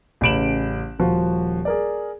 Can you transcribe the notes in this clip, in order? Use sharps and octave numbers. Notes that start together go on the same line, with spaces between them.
A1 C#3 B5 D7 E7 F#7
D#1 F3 F#4
G#4 A#4 D5